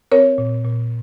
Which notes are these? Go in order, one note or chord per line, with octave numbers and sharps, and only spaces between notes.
C4 A#4 C#5
A#2
A#2